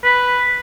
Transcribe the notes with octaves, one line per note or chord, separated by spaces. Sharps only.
B4